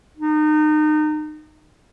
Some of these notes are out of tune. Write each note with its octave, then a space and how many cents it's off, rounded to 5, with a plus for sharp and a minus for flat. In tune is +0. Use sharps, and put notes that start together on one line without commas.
D#4 -30